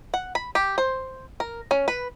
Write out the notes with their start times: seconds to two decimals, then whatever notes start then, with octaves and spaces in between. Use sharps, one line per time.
0.14 F#5
0.35 B5
0.55 G4
0.78 C5
1.40 A#4
1.71 C#4
1.88 B4